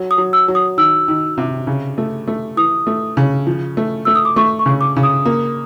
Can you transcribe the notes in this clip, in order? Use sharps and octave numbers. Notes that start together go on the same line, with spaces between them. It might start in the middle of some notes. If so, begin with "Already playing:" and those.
Already playing: F#3
D#6
F#3
E6
F#3
D#6
D#3 E6
D#3
C3
C#3
A3
A3
E3 D#6
A3
C#3
F3
A3
A3 E6
D#6
D6
A3 C#6
C#6
C#3
D6
C#3
D#6
A#3